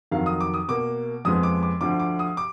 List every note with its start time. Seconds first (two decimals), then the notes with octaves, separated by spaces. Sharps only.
0.11 F2 D#3 F#3 F5
0.26 D#6
0.40 D6
0.54 D#6
0.68 B2 A#3 D6
1.25 F2 F3 G#3 B3 D#6
1.43 D6
1.63 D6
1.81 D2 D3 F3 D6
2.00 D6
2.19 D#6
2.37 D6